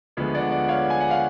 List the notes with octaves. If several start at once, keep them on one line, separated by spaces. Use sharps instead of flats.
D2 D3 F3 G#3 B3
D5 F#5
D5 F#5
C#5 F5
G#5
F#5
F5